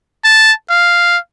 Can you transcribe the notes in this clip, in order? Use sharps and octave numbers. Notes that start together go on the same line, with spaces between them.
A5
F5